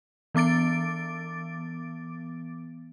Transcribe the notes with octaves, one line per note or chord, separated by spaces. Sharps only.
E3 B3 D6 A6 D7